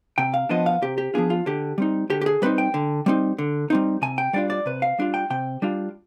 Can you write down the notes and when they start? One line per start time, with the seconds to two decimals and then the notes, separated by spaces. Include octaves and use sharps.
0.18 C3 G5
0.34 F5
0.49 F3 B3 D4 F4 D#5
0.66 F5
0.82 C3 G4
0.98 G4
1.14 F3 B3 D4 F4 G#4
1.30 F4
1.46 D3 G4
1.78 G3 C4 D#4
2.10 D3 G4
2.21 G4
2.26 G#4
2.42 G3 C4 D#4 B4
2.58 G5
2.74 D3
3.06 G3 C4 D#4
3.39 D3
3.70 G3 C4 D#4
4.02 C3 G#5
4.18 G5
4.33 G3 D4 F4 D5
4.50 D5
4.66 C3 B4
4.82 F5
4.99 G3 D4 F4
5.14 G5
5.30 C3 G5
5.62 G3 D4 F4